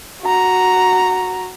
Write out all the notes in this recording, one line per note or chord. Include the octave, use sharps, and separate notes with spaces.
F#4 A#5